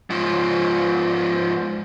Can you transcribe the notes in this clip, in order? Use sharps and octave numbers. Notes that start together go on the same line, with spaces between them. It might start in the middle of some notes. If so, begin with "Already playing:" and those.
G#2 F3